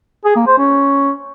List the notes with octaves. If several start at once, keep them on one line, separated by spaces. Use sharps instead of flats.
G#4
A#3
C5
C#4